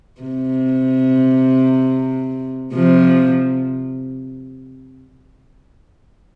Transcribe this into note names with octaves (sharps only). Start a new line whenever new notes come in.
C3
C3 F3